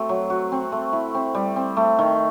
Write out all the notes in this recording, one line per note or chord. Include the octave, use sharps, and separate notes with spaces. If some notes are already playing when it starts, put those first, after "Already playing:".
Already playing: A3 C4 F#4
F#3
F#4
C4
A3
E4
C4
G3
C4
A3
D#3